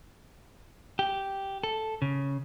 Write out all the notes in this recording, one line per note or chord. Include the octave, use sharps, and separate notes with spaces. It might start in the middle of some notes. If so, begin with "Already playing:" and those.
G4
A4
C#3